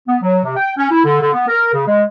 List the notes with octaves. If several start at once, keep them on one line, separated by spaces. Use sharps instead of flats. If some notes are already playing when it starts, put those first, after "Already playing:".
B3
F#3
C3
G5
C#4
E4
D3
D3
B3
A#4
C#3
G#3